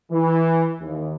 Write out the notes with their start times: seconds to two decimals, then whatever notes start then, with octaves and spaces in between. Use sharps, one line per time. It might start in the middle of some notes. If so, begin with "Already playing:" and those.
0.11 E3
0.80 D#2